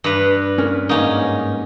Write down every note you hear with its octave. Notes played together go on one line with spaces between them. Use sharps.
G2 B4
C#4 A#4
G#2 A#3 C#4 D#4 A#5